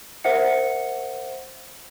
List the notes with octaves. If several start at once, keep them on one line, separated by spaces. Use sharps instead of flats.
A#4 C5 E5 F#5 C#7